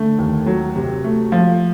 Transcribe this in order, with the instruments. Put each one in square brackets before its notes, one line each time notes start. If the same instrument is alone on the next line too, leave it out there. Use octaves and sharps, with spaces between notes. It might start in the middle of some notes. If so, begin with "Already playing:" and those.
Already playing: [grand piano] D3 A3
D#2
F#3
C3
A3
F3